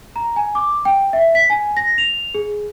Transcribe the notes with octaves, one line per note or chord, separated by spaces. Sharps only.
A#5
G#5
D6
G5
E5
B6
G#5
A#6
F7
G#4